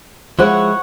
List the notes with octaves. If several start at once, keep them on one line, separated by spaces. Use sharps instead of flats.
F3 G#3 E4 C#5 F#5 C#6